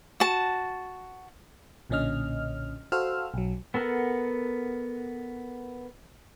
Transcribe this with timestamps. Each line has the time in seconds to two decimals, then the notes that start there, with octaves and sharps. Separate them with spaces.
0.20 F#4 A5
1.90 B1 A#2 D3 C#4 D#5 F6
2.92 F#4 A4 C5 F5 E6 F6
3.34 B1 F#3
3.74 B3 A4 A#4 F#5